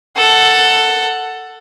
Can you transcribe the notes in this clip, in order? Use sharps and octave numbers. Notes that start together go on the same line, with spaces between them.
A4 F#5